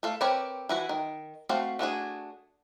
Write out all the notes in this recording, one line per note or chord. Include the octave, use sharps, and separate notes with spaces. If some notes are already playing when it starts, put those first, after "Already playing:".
A3 A4 F5
C4 G4 A#4 B4 C#5
E3 E4 F#4
D#3
A3 C4 F#4 F5
A3 D4 F#4 G#4